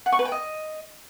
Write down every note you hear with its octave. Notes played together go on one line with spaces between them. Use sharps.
F#5
C#6
B4
G5
D#5